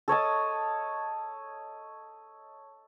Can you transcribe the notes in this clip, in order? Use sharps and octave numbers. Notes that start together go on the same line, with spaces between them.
A4 C#5 D#5 A5